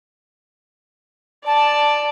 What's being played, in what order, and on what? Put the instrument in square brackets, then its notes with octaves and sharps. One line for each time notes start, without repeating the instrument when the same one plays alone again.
[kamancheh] D5 [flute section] A5